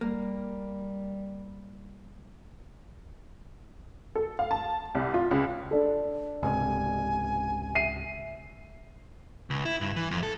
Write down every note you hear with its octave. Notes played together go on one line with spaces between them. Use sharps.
G3 A#3
A4
F5
A5
C2
F4
C#2
D4 A4
C#2 G#2 C3 G#5
E5 C7 D#7
C#2
E4
G2
E3
F2
A4